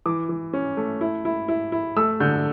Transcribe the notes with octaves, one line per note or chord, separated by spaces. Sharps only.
E3 D6
E3
C#4
A3
E4
E4
E4
E4
A3 E6
D3 G6